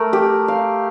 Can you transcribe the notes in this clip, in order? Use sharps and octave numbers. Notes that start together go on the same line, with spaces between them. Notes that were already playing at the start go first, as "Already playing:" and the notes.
Already playing: A3 A#4
G4
F5